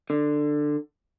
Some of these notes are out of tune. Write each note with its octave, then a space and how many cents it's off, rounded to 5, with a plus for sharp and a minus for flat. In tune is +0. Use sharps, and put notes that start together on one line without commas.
D3 +15